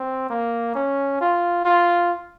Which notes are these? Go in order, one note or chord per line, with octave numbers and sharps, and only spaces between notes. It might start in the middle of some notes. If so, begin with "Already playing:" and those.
Already playing: C4
A#3
C#4
F4
F4